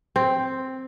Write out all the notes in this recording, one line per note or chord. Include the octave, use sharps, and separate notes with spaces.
C4